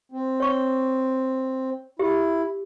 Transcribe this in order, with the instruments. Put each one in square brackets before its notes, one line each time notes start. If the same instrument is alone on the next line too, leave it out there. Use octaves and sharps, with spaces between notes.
[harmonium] C4
[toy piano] C#5 C#6
[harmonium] E4 [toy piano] G4